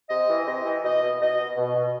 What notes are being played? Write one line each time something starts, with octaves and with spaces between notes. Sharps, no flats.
C3 D#5
E3
C3 D#5
E3
B2 D#5
B2
B2 D#5
B2
B2
B2